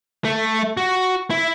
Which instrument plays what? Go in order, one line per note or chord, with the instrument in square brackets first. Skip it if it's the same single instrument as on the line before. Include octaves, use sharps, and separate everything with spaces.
[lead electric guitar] A3
F#4
E4